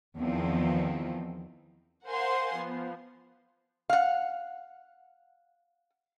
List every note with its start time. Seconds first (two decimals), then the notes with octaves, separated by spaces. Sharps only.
0.17 E2 D#3 F3 C4
2.07 A#4 C5 F5 F#5 G#5 C6
2.55 F3 B3
3.90 F5 F#5